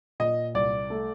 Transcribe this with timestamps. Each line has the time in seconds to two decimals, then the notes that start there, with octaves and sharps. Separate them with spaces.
0.20 A#2 D#5
0.54 C2 D5
0.90 A3